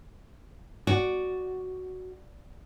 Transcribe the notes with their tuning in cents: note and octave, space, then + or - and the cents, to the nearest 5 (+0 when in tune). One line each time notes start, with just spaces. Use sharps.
F#4 +0 D5 +0